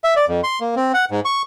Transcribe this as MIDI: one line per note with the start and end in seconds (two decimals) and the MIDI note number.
0.04 0.14 76
0.16 0.25 74
0.28 0.41 41
0.44 0.59 84
0.60 0.75 58
0.76 0.92 60
0.94 1.05 78
1.11 1.20 44
1.25 1.42 85